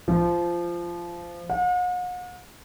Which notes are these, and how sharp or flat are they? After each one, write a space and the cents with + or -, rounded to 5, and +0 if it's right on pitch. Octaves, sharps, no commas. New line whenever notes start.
F3 -15
F#5 -45